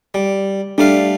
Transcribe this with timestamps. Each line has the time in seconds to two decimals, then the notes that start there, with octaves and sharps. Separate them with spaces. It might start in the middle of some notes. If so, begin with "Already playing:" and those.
0.14 G3
0.78 G3 A3 D4 F5